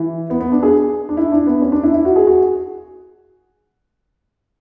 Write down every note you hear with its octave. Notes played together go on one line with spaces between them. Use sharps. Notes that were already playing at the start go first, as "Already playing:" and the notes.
Already playing: E3
B3
B3
D4
G#4
D4
E4
D4
B3
C#4
D4
E4
E4
F#4
G#4
F#4